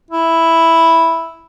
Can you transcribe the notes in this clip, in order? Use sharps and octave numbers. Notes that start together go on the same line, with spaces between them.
E4